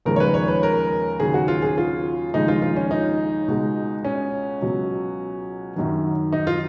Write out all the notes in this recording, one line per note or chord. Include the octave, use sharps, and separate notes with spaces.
D#2 C#3 F3 G#3 A#4
C#5
B4
C#5
B4
A#4
D#2 C#3 F#3 G#4
F#4
F4
G#4
F4
D#2 C#3 F3 G#3 D#4
F4
F4
C#4
D#4
C#2 B2 G#3
C#4
C#2 B2 F#3
F#2 D#3 F#3
D#4
F4